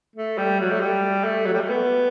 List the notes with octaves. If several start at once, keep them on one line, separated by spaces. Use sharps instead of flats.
A3
G3
F#3
A3
G3
A3
F#3
G3
A3
B3